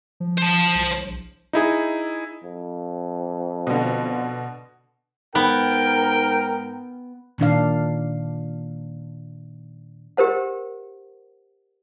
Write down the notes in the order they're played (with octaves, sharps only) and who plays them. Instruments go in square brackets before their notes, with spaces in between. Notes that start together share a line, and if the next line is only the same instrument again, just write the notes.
[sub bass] F3
[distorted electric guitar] C5 A5
[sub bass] C2
A#1
[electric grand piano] D#4 E4 G#4
[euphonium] F2
[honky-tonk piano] B2 D3
[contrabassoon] G#2 [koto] B3 [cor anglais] A#4 [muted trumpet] G5
[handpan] A#2 D#3 D4 F5
[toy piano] G4 A#4 C5 F#5